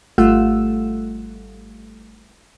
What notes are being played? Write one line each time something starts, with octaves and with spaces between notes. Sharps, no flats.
G#1 G3 A3 F4 F#5 E6